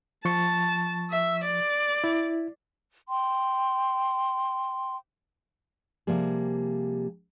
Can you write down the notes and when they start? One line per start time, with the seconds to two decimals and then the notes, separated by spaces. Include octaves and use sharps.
0.25 F3 A5 C#6
1.10 E5
1.44 D5
2.04 E4
3.09 G5 C6
6.07 C3 F3 G3 A#3 G#4